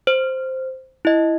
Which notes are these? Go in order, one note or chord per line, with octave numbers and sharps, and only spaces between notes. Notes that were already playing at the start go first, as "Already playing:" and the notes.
C5
E4 D#5